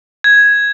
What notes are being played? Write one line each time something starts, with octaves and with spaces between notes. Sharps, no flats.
G#6